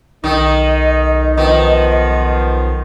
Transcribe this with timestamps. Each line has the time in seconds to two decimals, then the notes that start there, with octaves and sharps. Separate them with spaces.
0.24 B1 D#3 D#4 D#5
1.37 D#3 F3 B3